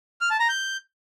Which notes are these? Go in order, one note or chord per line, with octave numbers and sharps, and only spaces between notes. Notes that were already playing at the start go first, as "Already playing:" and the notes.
F6
A5
A#5
G6